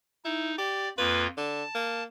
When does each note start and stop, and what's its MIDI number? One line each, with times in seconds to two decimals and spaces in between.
0.25 0.56 63
0.25 0.53 64
0.58 0.89 67
0.58 0.89 74
0.98 1.27 41
0.98 1.27 58
0.98 1.27 65
0.98 1.25 71
1.37 1.64 50
1.37 2.03 81
1.75 2.04 58